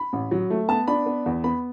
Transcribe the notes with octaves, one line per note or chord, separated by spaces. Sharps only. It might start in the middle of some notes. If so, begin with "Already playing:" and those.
Already playing: B5
A1
F#3
A3
B3 A5
D4 B5
B3
E2
B3 B5